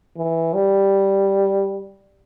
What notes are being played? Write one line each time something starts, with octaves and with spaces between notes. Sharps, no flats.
E3
G3